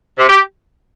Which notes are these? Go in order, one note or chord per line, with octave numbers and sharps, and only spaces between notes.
C3
G4